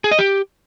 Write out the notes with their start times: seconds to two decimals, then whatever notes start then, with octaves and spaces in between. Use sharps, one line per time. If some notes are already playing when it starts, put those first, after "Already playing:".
0.04 G#4
0.11 D#5
0.19 G4